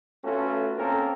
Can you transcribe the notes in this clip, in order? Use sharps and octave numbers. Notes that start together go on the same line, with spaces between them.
A3 B3 C#4 F4 F#4 A4
A#3 C4 C#4 A4 A#4